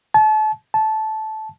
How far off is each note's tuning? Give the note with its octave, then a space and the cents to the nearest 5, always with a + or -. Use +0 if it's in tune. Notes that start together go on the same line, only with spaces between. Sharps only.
A5 -35
A5 -15